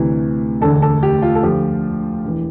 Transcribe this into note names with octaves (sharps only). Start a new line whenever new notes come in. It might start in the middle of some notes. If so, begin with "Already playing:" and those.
Already playing: D2 C3 E3
E1 D2 D3 A4
A4
G4
F4
A4
D2 D3 F3 G4
E1 E3